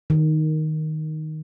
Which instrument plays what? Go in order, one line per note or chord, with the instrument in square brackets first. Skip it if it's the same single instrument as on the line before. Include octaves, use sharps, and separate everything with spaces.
[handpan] D#3